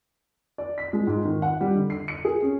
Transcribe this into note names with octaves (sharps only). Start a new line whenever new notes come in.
D5
B6
G#3
G#2
D#3
F#5
G3
D3
C7
C#7
G#4
C#4